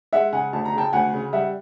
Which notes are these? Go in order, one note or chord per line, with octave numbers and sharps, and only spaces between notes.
G#3 E5 F#5
C#3 F#5 G#5
D2 A5
A#5
C#3 G5 A5
D2 F#5 G#5
C#3
G3 E5 F#5